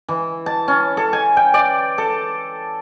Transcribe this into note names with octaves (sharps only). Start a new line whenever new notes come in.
E3
A5
C#4
A4
G#5
G5
D5
A4